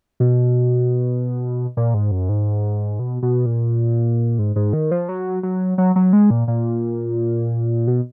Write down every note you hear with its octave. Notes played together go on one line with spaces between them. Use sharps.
B2
A#2
G#2
F#2
G#2
B2
B2
A#2
G#2
G#2
D#3
F3
F#3
F#3
F#3
F#3
G#3
A#2
A#2
B2